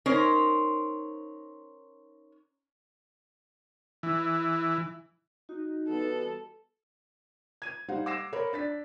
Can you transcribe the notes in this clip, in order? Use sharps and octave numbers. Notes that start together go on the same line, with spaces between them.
C#4 D#4 A#4 C5
E3
D#4 F#4
E3 G3 B3 A4
G#6 D#7
G3 D#4 C5 F5 F#5
F#5 D6 E6 A#6 C7 E7
A#4 C5 C#5 B5
D4 A6 B6